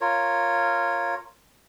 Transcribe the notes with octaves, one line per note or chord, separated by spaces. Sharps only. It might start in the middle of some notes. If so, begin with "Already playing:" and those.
F4 A#4 C#5